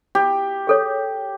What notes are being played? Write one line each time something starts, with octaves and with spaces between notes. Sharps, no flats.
G4
G#4 A4 C#5